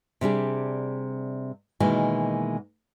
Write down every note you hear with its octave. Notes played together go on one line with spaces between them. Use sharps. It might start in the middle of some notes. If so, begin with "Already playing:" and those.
C3 G3 D4 G#4
B2 D#3 E3 G#3 A#3